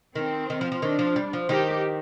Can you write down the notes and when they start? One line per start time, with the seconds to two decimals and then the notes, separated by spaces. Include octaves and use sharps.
0.15 D#3 C4
0.50 D#3
0.61 F3
0.72 F3
0.82 D#3 D4
0.99 F3
1.16 G3
1.33 F3
1.49 D#3 G4